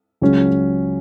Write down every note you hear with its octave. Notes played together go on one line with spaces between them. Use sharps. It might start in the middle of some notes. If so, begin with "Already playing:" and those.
C#2 C#3 F#3 C#4